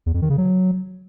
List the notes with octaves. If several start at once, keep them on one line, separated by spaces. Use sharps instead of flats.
E2
F2
D#3
C#3
F#3